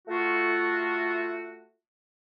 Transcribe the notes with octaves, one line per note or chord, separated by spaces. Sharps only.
A3 F4 F#4